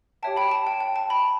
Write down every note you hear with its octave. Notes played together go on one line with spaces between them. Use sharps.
G4 C#5 E5 G5 A5
G5 B5
A5
G5
G5
A5
G5 B5